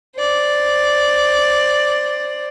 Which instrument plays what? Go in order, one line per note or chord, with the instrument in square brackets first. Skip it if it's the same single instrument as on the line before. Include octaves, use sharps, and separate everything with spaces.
[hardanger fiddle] C5 D5